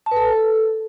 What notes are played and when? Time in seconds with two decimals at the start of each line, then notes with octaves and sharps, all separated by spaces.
0.06 A5
0.11 B4
0.17 A4